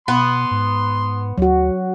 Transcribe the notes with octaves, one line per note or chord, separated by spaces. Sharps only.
B2 B3 C6
G#2
D2 F#3 F#4